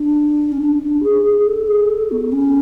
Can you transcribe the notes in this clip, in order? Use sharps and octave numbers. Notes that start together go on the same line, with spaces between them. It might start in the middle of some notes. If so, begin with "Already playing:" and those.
Already playing: D4
C#4
D4
D4
G#4
G#4
A4
G#4
A4
B3
C#4